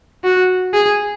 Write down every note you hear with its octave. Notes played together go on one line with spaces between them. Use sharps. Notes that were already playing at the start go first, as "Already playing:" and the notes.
F#4
G#4